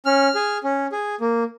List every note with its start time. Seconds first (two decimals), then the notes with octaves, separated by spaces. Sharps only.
0.06 C#4 F6
0.35 G#4
0.64 C#4
0.92 G#4
1.21 A#3